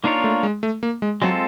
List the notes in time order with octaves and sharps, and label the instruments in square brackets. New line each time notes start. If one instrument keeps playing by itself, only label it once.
[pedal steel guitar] A#3 D4 F4 A#4 C#5 [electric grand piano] D#4
[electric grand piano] A3
G#3
A3
A#3
G#3
[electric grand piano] F#3 [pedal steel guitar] G#3 C4 F4 A4